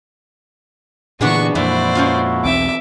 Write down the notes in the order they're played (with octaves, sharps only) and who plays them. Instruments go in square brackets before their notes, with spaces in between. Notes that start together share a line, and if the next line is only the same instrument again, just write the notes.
[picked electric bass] A#2 D3 E3 [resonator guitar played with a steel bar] B3 D4 G#4 [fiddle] F#4 C#6
[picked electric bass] F2 A#2 [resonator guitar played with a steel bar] E3 [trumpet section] E4 F#4 [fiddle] C5 D5
[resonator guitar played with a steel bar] F3 C#4 F4
[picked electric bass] B1 E2 C4 [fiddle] E5 D6